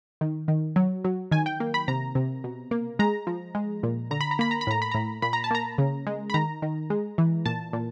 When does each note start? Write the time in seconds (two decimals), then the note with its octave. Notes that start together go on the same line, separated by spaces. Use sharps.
0.21 D#3
0.48 D#3
0.76 F#3
1.05 F#3
1.31 D#3 G#5
1.46 G5
1.60 A#3
1.74 B5
1.88 C3 A#5
2.15 C3
2.44 B2
2.71 A#3
2.99 G#3 A#5
3.27 F3
3.55 G#3
3.83 A#2
4.11 D3 A#5
4.21 B5
4.31 A#5
4.39 A#3 B5
4.51 A#5
4.61 B5
4.67 A2 A#5
4.82 B5
4.91 A2 A#5
5.22 A#2 B5
5.33 A#5
5.44 A5
5.51 A#3 A#5
5.78 C#3
6.07 G#3
6.30 B5
6.34 D#3 A#5
6.62 D#3
6.90 G#3
7.18 E3
7.46 A#2 A5
7.73 A#2